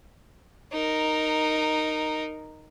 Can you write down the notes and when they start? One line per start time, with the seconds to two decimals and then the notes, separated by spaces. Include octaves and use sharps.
0.72 D#4 A#4